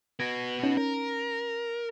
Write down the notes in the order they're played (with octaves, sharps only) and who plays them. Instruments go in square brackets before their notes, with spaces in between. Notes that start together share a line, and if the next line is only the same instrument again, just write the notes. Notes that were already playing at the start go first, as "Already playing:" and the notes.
[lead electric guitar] B3 F#4 [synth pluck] G#6 A#6 D7
[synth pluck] C#4 D#4
[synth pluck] C#4 [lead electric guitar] A#4